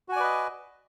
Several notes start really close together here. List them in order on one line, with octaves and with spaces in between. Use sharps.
F#4 G#5 D5 B4 D#5